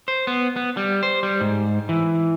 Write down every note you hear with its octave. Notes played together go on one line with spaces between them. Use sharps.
C5
B3
B3
G3
C5
G3
G#2
E3